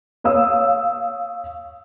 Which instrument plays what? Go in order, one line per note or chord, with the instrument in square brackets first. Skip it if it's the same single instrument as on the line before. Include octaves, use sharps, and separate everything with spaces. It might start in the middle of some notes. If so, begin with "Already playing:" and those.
[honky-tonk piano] C#5 F5 D#6 E6